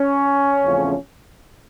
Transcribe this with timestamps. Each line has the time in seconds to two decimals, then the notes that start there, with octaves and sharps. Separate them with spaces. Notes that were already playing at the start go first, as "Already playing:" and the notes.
Already playing: C#4
0.62 E2 C#3 F3 A3 C4